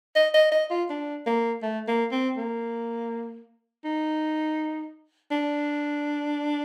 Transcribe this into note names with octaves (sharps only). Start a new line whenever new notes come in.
D#5
D#5
D#5
F4
D4
A#3
A3
A#3
C4
A#3
D#4
D4